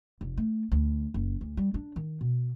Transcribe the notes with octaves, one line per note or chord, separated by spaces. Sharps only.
F1
A3
D2
F#1
D2
G3
D4
D#3
B2